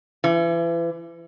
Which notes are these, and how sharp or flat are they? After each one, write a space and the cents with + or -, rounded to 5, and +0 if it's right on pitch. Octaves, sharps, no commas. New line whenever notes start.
E3 +35